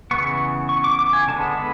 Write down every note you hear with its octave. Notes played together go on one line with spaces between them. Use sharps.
C#3 E3 B3 C#6
C#6
D6
D6
G#5
D3 G#3 B3 A5
B5